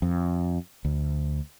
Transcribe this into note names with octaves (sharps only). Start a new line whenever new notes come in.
F2
D2